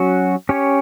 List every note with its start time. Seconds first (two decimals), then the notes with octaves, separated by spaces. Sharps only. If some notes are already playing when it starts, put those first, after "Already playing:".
Already playing: F#3 C#4 F#4
0.49 C#4 G4 C#5